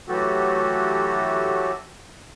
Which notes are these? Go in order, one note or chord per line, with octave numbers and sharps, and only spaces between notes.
E3 F#3 A3 F#4 G4 A4